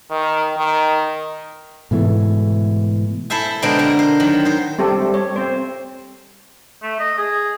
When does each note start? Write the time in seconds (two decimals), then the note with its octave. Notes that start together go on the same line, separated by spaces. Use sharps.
0.11 D#3
0.57 D#3
1.91 G#2 B2 E3 A3
3.30 E4 A4 C5 E5 G#5
3.62 B2 D3 G#3 C4 A#4 G5
3.79 A#4
3.99 C5
4.20 D#3 F#3
4.45 D#4 C5
4.79 G3 C4 G4 A4
5.02 G3
5.14 C#5
5.36 C4 C5
6.83 A3
7.00 D#5
7.18 G#4